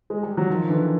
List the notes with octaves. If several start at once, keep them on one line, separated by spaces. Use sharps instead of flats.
G#3
G3
F#3
D#3 F3
D3 E3